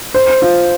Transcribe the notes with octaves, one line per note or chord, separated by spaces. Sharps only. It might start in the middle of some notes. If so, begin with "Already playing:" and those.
C5
F4